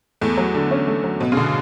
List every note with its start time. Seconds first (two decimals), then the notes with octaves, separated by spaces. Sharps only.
0.21 E2 A3
0.37 F#3
0.54 D3
0.71 C#4
0.87 A3
1.04 F#3
1.20 B2 F#3
1.32 C#3
1.37 B2 D3